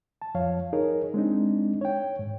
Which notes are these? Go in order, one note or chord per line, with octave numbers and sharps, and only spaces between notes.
A5
F2 F3 C#5 F5
D#4 G#4 A#4 C#5
G#3 C4 D4 D#4
C#5 G5
G#2